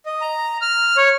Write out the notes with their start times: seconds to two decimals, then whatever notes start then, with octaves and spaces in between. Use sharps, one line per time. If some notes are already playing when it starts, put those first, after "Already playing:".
0.06 D#5
0.21 A#5
0.62 F6
0.97 C#5